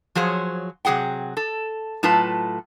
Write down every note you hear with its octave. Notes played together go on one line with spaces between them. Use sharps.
F3 F#3 G#4 C5 C#5
C3 F#3 G#4 F#5 G5
A4
A2 F#3 F4 A4 B4 A5